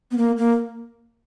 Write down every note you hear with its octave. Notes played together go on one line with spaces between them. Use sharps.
B3
A#3
A#3